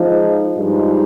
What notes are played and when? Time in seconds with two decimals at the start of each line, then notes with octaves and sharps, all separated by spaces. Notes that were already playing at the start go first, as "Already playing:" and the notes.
Already playing: F3 G#3 D#4
0.55 G2 F3 G#3 D#4